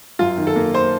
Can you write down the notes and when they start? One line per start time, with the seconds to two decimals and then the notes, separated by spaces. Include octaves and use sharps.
0.19 F#2 F4
0.38 D#3
0.47 A4
0.56 A#3
0.74 C5